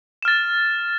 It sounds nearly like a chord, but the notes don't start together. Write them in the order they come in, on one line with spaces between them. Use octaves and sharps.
E7 F6 A6